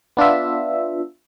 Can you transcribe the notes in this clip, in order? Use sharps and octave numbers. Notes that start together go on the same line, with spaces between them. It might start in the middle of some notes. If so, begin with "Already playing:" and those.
B3 D4 F4 E5